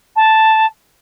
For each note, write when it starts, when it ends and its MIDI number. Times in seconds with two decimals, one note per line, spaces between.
0.16 0.66 81